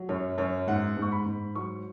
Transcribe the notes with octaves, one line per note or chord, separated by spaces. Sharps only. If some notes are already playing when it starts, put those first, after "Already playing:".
Already playing: F#3
F#2 C#5
F#2 C#5
G#2 F#5
G#2
C#6
B5
G#2
F#3 C#6